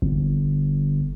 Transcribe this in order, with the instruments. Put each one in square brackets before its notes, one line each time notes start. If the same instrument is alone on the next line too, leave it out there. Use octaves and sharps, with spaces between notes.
[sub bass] G1